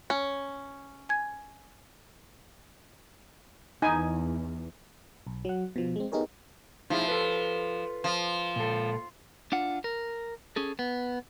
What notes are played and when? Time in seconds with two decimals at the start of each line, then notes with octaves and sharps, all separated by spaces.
0.10 C#4
1.09 G#5 G#6
3.82 E2 D#4 G#5
5.27 B1
5.45 F#3 F#5
5.76 B2 F3
5.96 G#3 C4
6.12 B3 D#4 G4 G#4 A#4 C#5
6.90 F3 D#4 E4 G#4
7.08 A4 B4
8.04 F3
8.56 A#2 A4
9.52 D4 F4 F#5
9.84 A#4
10.56 C#4 G#4 A4
10.79 B3